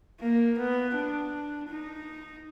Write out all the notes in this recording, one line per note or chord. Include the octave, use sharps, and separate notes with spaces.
A#3
B3
D4
D#4